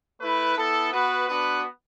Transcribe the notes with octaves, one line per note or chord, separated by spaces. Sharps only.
A3 E4 B4
B3 E4 A4
B3 F#4 B4
B3 D4 F#4 B4